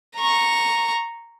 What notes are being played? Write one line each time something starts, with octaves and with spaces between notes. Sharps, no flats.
A#5 C#6